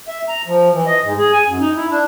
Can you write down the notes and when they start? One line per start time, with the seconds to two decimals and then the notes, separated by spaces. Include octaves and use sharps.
0.08 E5
0.29 A#5
0.47 F3
0.73 E3
0.87 D#5
1.04 G#2
1.18 G#4
1.33 G#5
1.48 F#2
1.60 D#4
1.76 E4
1.90 D4